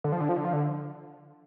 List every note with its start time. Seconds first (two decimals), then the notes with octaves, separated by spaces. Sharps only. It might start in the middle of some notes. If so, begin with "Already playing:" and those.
0.04 D3
0.12 F3
0.20 D3
0.29 F3
0.37 D3
0.45 F3
0.53 D3